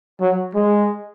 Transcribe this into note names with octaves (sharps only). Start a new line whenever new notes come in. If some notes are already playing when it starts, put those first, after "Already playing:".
F#3
G#3